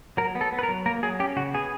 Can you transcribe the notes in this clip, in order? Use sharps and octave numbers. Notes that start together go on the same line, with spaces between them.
F#3 A#4
B3
A4
B3
B4
A#4
F#3
A#3 A#4
F#3 G#4
C#4 G4
C#3 F#4
B3 G#4